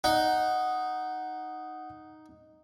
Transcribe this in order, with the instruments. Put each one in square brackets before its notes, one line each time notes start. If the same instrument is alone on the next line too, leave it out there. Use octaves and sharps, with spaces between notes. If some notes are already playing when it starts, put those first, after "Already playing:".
[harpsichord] D#4 [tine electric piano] F#5